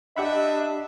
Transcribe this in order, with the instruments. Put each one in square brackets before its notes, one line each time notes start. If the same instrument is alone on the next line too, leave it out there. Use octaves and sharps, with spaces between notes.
[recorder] D4 [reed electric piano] G4 F#5 B5 [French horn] D#5 [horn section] E5